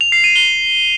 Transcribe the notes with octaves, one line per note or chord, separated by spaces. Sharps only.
F7
C7
D#7
G7